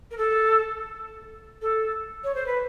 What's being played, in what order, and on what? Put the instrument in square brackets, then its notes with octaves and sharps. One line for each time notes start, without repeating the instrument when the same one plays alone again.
[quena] A#4
A4
A4
C#5
C5
B4